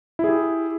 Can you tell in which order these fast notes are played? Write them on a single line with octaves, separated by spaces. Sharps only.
E4 G#4 G4